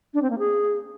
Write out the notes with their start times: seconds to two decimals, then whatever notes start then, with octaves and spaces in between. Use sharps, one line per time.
0.14 D4
0.22 C4
0.30 A#3
0.39 G#4